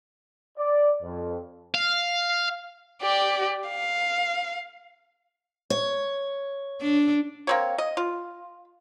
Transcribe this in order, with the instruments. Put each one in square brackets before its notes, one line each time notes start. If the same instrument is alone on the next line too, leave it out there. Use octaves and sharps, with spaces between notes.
[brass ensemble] D5
F2
[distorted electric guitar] F5
[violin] G4 D5
F5
[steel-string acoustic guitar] C#5
[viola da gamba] D4
[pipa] A#3 C4 C#5
D#5
F4